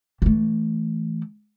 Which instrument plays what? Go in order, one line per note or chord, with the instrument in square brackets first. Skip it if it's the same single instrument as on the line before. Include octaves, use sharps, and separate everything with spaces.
[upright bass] E3 A3